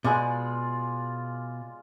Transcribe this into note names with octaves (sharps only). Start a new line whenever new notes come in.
B2 G#3 F4 D5